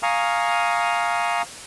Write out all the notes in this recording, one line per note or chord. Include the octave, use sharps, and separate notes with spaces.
F5 G#5 A#5 C#6 D#6 F6